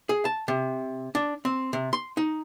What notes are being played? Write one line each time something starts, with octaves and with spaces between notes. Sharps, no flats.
G#4
A5
C3
D4
C4
C3
C6
D#4